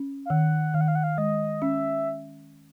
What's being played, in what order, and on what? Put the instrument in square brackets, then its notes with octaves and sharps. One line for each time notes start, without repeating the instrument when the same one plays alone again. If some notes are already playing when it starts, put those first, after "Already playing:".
Already playing: [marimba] C#4
[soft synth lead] F5
[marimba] D#3 [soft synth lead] F#5
[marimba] D#3 [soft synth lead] F5
[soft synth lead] F#5
F5
F#5
F5
[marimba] G#3 [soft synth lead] D#5
[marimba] C#4 [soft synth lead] E5